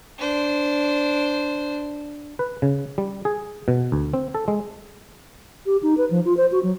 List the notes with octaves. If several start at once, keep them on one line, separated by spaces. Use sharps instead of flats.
D4 C5
B4
C#3
G3
G#4
B2
D2
C4
A4
G#3
G4
D#4
B4
F3
F4
C5
F#4
F#3